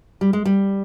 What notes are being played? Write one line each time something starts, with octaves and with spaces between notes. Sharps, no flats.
G3
G#3
G3